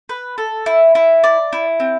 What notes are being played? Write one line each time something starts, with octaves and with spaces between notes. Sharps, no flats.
B4
A4
E4
E4
D5
E4
C4